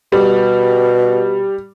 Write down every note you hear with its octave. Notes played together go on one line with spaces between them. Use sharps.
B2 G3